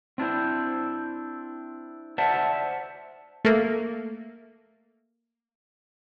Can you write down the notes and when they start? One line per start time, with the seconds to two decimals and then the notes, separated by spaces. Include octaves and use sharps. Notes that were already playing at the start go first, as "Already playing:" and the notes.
0.18 C4 D4 E4 C5
2.18 C5 D5 E5 F#5 A5
3.45 A3 A#3